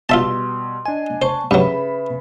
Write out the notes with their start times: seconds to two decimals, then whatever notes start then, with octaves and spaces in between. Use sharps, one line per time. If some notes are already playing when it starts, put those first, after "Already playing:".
0.09 B2 G3 F4 E5 A5 C6 E6
0.85 D4 D#5 G#5
1.22 C5 A5 C#6
1.51 G2 C#3 F#3 B4 E5 B5